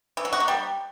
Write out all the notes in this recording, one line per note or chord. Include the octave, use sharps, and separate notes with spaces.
E3
F#3
F#4
A#3
G3